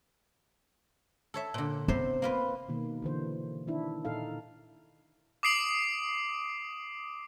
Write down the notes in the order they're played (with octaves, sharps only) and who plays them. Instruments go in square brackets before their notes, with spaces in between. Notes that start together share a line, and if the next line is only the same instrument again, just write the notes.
[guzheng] A4 C#5 E5
A#2 D3
[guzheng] C3 C5 [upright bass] B3
[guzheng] A#3 F4 B4
[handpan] B2 D#3 A#3
D3 E3 C5
D#3 D4 E4
A#2 D#4 A4 F5
[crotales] D6 D#6 C7 D7 F#7